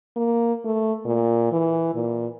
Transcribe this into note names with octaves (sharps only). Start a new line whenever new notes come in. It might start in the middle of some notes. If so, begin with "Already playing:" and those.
A#3
A3
A#2
E3
A#2